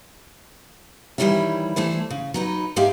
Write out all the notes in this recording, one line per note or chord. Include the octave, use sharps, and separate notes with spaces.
D#3 E3 G3 E4 C#5 E5
E3 A3 E4 C5
C#3
F#3 D#4 B4
G#2 G#3 G4 E5 F5